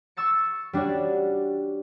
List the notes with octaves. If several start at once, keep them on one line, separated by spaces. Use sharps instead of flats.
C#6 E6 A6 C#7
G3 D4 F#4 C#5